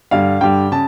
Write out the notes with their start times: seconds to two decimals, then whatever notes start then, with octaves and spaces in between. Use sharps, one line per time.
0.11 G2 D3 G3 F5
0.41 G2 D3 G3 G5
0.72 C#3 A5